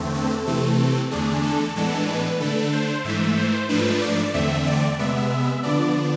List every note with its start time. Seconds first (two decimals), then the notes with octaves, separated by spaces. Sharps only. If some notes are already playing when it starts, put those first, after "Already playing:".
Already playing: E2 D3 A3 C4
0.15 A4
0.46 C3 E3 A3 C4
1.11 E2 D3 A3 D4 G#4
1.43 A4
1.75 A2 E3 G#3 B3 D4 A4
2.08 B4
2.40 D3 A3 D4 A4
2.73 C5
3.04 G#2 E3 A3 E5
3.38 C5
3.69 G#2 F3 A3 D4 B4
4.02 D5
4.34 E2 D3 A3 C4 E5
4.67 D5
4.99 C3 G#3 B3 E5
5.30 E5
5.63 D3 F3 B3 D4 D5